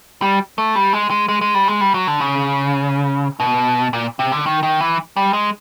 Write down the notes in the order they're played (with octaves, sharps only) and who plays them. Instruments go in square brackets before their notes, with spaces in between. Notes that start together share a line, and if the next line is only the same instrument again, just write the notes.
[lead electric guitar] G3
A3
G3
G#3
G#3
G#3
G#3
G3
G#3
G3
F#3
D3
C#3
B2
A#2
C3
D3
D#3
D#3
E3
G3
G#3